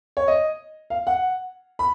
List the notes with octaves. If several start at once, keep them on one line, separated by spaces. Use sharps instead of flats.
C#5
D#5
F5
F#5
B5